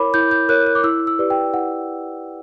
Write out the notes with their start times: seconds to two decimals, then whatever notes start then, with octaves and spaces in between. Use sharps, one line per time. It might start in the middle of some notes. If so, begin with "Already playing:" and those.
Already playing: E4 A#4 C#5 B5 D6
0.14 E4 G6
0.31 G6
0.49 A#4 C#5 F#6
0.67 F#6
0.75 D6
0.84 E4 E6
1.07 E6
1.19 G4 B4 D5
1.30 G5
1.54 E4 F#5